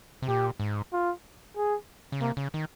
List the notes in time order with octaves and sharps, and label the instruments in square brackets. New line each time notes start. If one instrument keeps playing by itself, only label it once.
[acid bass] C3
[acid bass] A#2 [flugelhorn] G4
[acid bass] G#2
[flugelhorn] F4
G#4
[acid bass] C#3
[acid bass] C3 [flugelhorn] A#3
[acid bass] C#3
D#3